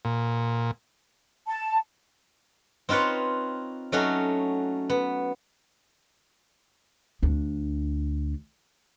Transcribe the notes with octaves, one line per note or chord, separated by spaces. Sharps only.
A#2
A5
C4 D#4 F4 B4 C#5
F#3 A3 C#4 D#4 F#4
B3
D2 D4